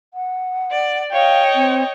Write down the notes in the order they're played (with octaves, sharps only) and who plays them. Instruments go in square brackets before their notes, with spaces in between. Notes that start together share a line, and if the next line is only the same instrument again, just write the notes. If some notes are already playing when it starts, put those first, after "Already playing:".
[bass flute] F#5
[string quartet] D5
[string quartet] C#5 D#5 [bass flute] F5 [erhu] G5
[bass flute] C4